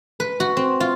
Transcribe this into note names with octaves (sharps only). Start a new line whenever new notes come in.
B4
F#4
C4
F4